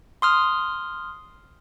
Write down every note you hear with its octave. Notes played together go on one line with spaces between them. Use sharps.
C6 D#6 F6